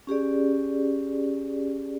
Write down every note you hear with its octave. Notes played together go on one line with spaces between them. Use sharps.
C#4 G4 G#4 D5